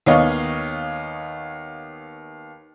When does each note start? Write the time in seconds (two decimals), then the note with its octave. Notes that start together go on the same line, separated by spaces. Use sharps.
0.06 D#2 B3 C#5 D#5 F5 C#6